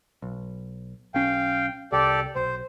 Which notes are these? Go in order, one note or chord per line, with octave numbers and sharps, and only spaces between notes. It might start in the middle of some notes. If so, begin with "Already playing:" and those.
B1
B1 C#4 F5 G5
C2 G4 A4 D5
B1 C5